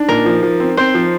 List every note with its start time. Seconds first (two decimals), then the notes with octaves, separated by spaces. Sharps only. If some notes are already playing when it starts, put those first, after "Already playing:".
Already playing: D4 D#4
0.09 A#2 A#4
0.26 F3
0.43 F3
0.60 C4
0.77 C4 C5
0.94 F3